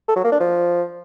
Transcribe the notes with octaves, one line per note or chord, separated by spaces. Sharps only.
A4
F#3
A#3
D4
F3